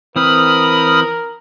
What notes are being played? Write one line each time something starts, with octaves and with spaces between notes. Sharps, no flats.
E3 C4 A#4 B5 D#6 F6